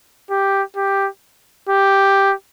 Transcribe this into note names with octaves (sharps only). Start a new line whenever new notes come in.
G4
G4
G4